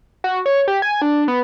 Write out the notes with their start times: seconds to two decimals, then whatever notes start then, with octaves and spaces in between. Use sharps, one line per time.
0.24 F#4
0.46 C#5
0.68 G4
0.82 G#5
1.02 D4
1.28 B3